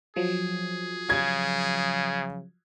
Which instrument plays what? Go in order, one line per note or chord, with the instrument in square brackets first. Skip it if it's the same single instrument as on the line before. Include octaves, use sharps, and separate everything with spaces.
[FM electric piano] F3 F#3 [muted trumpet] G#4
[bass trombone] C#3 [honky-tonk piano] G#6